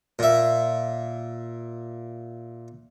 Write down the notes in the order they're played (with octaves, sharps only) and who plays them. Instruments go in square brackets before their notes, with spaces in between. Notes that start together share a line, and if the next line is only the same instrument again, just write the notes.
[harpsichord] A#2 E5